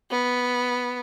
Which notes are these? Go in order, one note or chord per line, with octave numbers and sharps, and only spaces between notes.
B3